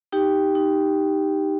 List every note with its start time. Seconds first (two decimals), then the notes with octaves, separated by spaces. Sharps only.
0.12 D#4 G4 G5
0.55 D#4